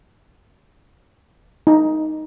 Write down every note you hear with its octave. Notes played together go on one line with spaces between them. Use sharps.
D#4